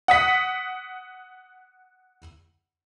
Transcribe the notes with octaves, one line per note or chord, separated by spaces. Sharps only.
F#5 D#6 B6